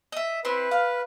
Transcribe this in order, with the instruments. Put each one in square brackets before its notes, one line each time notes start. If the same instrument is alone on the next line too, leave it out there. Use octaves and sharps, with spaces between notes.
[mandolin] D#5 E5
[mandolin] C4 E4 C6 [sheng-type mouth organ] B4
[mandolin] F5